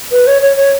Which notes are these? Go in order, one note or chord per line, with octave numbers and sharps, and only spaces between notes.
B4
C#5
C#5
C#5